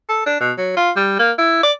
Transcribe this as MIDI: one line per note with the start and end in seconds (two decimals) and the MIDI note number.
0.09 0.24 69
0.26 0.38 62
0.40 0.52 47
0.58 0.72 54
0.76 0.91 65
0.96 1.16 55
1.19 1.31 58
1.38 1.58 64
1.63 1.72 74